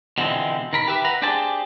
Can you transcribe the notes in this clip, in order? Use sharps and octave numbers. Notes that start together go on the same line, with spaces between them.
B2 D3 E3 F3 G#3 C4
D#3 A#4 B5
G4 B4 E5
B4 F#5 A#5
D4 G4 G#4 C5 A5